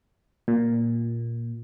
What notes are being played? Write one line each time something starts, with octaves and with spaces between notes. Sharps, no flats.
A#2